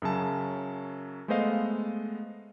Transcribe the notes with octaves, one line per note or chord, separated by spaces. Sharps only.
F#2 C#3 F#3 A5
G#3 A3 B3 C5 D#5 F5